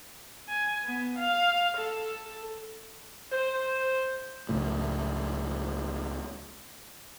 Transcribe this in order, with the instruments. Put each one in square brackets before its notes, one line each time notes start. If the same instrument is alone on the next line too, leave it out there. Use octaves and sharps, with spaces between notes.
[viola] G#5
B3
F5
A4
[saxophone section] C5
[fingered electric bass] C#2 A2